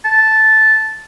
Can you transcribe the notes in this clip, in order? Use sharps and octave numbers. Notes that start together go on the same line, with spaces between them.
A5